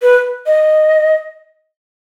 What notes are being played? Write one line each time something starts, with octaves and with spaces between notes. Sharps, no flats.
B4
D#5